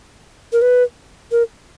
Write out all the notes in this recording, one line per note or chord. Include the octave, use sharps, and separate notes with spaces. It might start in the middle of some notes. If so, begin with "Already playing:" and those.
A#4
B4
A#4